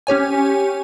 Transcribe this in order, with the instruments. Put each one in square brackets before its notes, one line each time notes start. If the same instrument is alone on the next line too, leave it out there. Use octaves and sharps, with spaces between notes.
[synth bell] C#4 G4 C#5 G#5